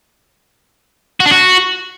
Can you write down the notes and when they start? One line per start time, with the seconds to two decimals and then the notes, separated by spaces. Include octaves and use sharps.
1.20 F#4
1.26 D4
1.31 F#4